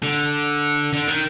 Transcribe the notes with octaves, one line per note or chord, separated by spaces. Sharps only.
D3
D3
D#3